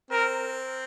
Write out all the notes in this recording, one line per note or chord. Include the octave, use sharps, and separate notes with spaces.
C4 A#4